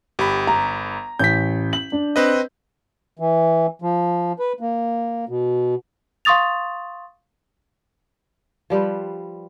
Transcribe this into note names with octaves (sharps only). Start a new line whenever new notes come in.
G1 G4 B5
A#5
A1 G6 B6
F#7
D4
C4 B4 D#5
E3
F3
B4
A#3
B2
F5 C6 C#6 D#6 A6 F7
F3 G3 B4 C5